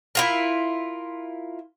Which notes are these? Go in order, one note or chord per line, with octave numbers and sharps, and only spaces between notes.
E4 F4 A#4